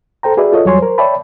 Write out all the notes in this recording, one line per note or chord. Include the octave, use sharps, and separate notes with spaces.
A4 C5 G5 A#5
F#4 G#4 B4 D5 E5
F4 A4 C#5 D#5
E2 F#3 G3 C#5 G#5 C6
A#4 C5
C#5 D5 E5 G5 A5 B5